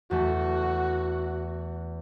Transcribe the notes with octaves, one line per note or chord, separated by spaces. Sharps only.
E2 A3 F#4